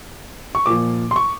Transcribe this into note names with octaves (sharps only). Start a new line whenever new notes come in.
C#6
A#2 F3 D6
C6
C#6